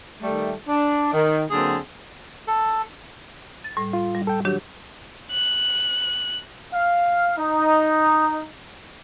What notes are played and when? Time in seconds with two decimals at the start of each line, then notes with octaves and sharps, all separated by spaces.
0.23 D#3 G3 A3
0.68 D4
1.14 D#3
1.51 D3 F#3 A#3 C4 G#4
2.47 A4
3.64 A6
3.77 A2 G3
3.93 F4
4.15 G3
4.27 A4 G5
4.45 D#3 F#3 D4 G4
5.32 F#6
6.73 F5
7.37 D#4